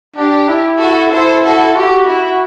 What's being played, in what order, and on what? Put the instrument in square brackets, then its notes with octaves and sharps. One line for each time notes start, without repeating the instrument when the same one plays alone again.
[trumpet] D4 [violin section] G4
[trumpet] E4
[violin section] F#4 A4
[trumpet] E4 [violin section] A4 C5
[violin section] F#4 A4
[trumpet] F#4 [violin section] G4
[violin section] E4